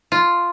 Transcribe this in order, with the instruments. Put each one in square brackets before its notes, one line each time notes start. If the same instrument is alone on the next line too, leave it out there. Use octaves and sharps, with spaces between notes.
[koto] F4